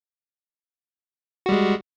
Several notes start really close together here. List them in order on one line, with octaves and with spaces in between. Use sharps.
F#4 G3 G#3